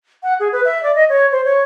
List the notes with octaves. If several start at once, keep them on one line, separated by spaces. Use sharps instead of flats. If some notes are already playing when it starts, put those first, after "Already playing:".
F#5
G#4
B4
E5
D5
D#5
C#5
C5
C#5